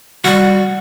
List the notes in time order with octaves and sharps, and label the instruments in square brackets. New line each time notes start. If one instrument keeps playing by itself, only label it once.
[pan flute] G3 [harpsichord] F#4